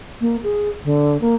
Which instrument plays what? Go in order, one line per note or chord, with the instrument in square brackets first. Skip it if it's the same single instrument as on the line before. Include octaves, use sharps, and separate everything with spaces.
[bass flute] A#3
G#4
D3
A#3